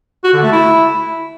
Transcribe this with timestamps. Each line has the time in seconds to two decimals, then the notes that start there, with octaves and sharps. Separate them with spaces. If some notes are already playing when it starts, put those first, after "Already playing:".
0.24 F#4
0.33 D3
0.42 A3
0.52 E4